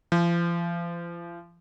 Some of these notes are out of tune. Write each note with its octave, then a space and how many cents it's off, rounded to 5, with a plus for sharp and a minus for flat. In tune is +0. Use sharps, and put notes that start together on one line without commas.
F3 -40